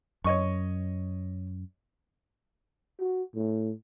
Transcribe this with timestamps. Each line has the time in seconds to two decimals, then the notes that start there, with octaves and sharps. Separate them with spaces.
0.24 F#2 C#5 D#5 C#6
3.00 F#4
3.35 A2